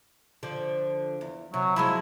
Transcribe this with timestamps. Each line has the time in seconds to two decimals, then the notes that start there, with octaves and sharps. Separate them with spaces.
0.43 D3 F3
1.21 E2
1.54 C3 F#3
1.76 F3 F#3 G#3 E4